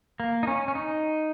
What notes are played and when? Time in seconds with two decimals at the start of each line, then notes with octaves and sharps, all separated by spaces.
0.20 A#3
0.43 D#4
0.47 C#4
0.68 C#4
0.75 D#4